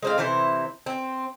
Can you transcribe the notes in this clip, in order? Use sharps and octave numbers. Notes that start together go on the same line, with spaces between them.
G#3 C4 F5
C3 E3 E4 C5
C4